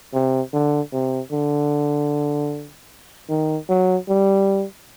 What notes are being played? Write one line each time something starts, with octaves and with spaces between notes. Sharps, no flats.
C3
D3
C3
D3
D#3
F#3
G3